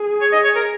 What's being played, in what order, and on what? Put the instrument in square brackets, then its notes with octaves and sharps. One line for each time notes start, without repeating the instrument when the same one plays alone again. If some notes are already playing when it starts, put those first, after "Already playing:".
Already playing: [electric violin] G#4
[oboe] C#5
D#5
C#5
A#4